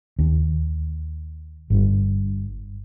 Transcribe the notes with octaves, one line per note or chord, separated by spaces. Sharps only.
D#2
G1 G2